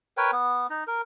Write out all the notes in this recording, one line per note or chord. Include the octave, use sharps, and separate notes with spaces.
A#4 B4 C#5 G5
B3
D#4
A#4